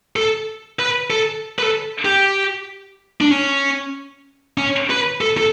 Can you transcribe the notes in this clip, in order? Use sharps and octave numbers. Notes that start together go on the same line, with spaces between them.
A4
B4
A4
B4
A4
G4
D4
C#4
C#4
B4
A4
A4